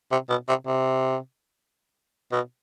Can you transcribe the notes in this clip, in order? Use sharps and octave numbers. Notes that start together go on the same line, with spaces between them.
C3
B2
C3
C3
B2